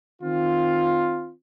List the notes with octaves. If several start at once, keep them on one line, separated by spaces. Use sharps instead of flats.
D#3 C4 F4